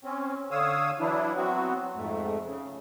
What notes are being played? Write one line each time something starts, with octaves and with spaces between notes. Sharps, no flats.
C4 C#4
D3 C#5 F5 D#6 E6
E3 F#3 D4 E4
F#3 B3 C4 F#4
F2 G#2 A3
C#3